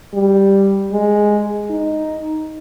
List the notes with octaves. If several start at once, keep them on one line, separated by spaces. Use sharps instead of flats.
G3
G#3
D#4